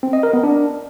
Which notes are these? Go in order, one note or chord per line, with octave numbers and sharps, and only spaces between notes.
C4
D#5
A#4
B3
D4